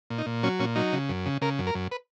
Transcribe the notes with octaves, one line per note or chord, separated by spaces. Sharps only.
A#2
D#4
A#2
F#3 C#4
A#2 C#4
F#3 D#4
C#3
F#2
C#3
C#3 A#4
F#2
A#4
F#2
B4